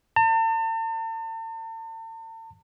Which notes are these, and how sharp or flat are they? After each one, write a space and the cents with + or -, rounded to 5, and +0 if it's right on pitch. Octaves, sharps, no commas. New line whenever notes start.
A5 +40